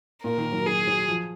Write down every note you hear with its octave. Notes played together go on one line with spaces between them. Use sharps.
A#2 A#4
D#3
F#3
F#3 G#4
F#3
F3